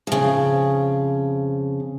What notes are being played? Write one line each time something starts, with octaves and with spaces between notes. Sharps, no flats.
F2 C#3